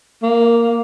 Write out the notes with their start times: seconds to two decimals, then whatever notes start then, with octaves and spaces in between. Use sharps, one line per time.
0.23 A#3